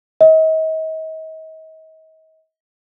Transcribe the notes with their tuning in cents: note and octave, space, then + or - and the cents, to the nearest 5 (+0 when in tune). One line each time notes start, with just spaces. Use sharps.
D#5 +40